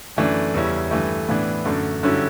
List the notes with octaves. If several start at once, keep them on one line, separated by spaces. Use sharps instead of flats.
F#2 E3 A3 D4
E2 C#3 G3 C#4 E4
G2 E3 A3
A2 E3 B3 D4
F#2 D3 A3
G2 D3 F#3 C#4 E4